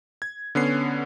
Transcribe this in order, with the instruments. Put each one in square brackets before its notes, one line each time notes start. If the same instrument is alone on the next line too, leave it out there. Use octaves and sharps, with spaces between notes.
[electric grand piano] G#6
D3 B3 C#4 C7